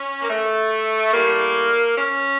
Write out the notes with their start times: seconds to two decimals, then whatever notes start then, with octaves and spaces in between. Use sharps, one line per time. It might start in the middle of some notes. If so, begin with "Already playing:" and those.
Already playing: C#4
0.22 A#3
0.30 A3
1.12 A2 G3 A#3
1.96 C#4